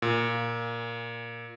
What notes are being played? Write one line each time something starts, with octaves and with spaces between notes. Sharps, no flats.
A#2